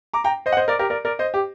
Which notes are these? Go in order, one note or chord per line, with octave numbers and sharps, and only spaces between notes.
A#5 D6
G5 A#5
C5 D#5
F#5
C5 D#5
A#4 D5
G4 A#4
A#4 D5
A#4 D5
C5 D#5
G4